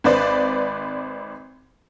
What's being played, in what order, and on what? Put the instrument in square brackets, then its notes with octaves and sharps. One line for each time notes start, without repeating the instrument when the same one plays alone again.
[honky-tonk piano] G#1 B4 C5 D5